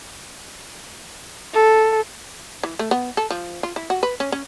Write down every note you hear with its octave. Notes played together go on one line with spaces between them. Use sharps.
A4
E3
A3
B3
A4
F3
F4
E4
F#4
B4
C#4
C#4